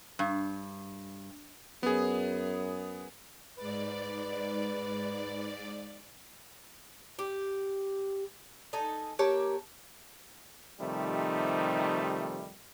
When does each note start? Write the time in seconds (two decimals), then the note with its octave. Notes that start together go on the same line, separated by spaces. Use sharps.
0.19 G2
1.83 F#2 B3 G#4
3.57 G#2 B4 D5
7.19 G4
8.73 D#4 A4 G#5
9.19 A#3 G4 C#5 A5
10.81 C3 D#3 F3 G3 A3 D#4